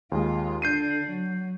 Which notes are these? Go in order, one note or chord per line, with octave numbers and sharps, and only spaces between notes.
D#2 G#3 F4
D3 D4 G6 C7 D#7
F#3